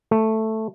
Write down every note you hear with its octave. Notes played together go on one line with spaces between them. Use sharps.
A3